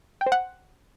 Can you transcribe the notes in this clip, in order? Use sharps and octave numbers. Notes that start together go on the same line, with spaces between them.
G5
C5
F#5